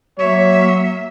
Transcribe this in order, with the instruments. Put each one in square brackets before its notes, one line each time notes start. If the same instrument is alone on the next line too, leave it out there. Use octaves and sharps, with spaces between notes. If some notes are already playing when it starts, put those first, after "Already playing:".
[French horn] F#3 [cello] A#3 E5 [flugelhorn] C#5